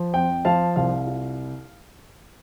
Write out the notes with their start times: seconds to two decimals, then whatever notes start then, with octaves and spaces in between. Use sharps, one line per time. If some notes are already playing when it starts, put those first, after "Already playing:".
Already playing: F3
0.14 F2 G5
0.45 F3 F5 A5
0.76 C2 F5
1.07 F4